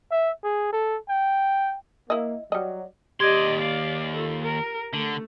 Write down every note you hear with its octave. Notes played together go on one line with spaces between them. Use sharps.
E5
G#4
A4
G5
A#3 E4 D#5
F#3 G3 D#5
D#2 G4 D5 D#5 C6 G#6
D5 F5
F4 A4
A#4
D3 A3